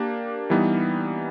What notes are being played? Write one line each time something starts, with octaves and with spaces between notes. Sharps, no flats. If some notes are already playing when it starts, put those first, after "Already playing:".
Already playing: A#3 D4 G4
E3 G3 B3 D#4